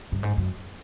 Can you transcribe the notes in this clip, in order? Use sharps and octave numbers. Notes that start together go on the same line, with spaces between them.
G2
G#2
F#2